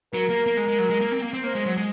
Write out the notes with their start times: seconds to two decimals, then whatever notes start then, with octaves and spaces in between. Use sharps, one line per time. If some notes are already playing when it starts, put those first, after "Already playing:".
0.14 F#3 A#4
0.30 A#3
0.47 A#3
0.57 G#3
0.68 G#3
0.79 F#3
0.90 G#3
1.01 A#3
1.12 C4
1.22 A#3
1.33 C4
1.44 A#3 C5
1.55 G#3
1.66 F#3
1.77 G#3